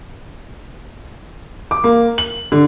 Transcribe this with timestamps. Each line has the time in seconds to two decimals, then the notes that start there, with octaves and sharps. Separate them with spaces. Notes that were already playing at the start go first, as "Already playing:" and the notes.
1.71 D6
1.84 A#3
2.18 F#7
2.52 D3